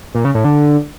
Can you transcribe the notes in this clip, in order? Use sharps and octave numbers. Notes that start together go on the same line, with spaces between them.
A#2
C#3
A2
D3